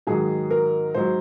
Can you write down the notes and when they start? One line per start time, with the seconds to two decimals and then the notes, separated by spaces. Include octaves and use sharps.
0.07 G#2 D#3 F#3 G#4
0.51 A#4
0.94 G#2 F#3 C5